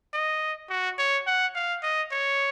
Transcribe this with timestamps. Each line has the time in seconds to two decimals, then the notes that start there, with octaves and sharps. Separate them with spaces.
0.14 D#5
0.70 F#4
0.98 C#5
1.27 F#5
1.55 F5
1.83 D#5
2.11 C#5